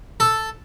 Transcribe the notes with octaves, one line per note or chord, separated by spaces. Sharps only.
A4